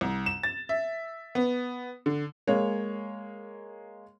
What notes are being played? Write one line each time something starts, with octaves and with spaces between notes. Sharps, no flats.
C2
E7
A6
E5
B3
D3
G#3 A#3 C#5